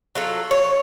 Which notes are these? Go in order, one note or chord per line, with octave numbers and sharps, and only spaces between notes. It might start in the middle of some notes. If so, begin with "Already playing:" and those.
F#3 F4 A4
C#5